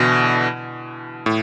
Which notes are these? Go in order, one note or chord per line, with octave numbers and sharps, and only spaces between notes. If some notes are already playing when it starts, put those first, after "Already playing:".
Already playing: B2 D3 E3
A2